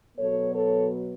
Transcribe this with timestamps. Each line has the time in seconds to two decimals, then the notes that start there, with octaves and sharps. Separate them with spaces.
0.16 B2 F#3 B3 A4 C#5
0.52 A4 C#5